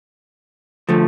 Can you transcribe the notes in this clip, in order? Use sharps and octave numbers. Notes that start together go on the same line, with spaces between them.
D3 F3 A3